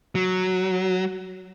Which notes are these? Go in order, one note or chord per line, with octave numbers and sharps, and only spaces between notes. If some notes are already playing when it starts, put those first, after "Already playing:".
F#3